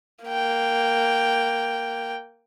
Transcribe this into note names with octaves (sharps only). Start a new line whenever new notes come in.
A#3 G5